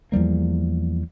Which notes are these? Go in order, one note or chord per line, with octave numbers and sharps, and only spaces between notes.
E2 F3 G3 A#3